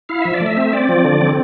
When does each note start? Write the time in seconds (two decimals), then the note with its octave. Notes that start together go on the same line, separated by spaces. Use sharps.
0.09 E4 F5
0.22 F3 E5
0.34 D5
0.41 A3
0.46 E5
0.57 C4
0.73 C4 D5
0.89 F3
1.04 D3
1.21 C4